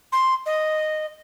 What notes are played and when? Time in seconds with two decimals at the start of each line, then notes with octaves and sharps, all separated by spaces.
0.12 C6
0.46 D#5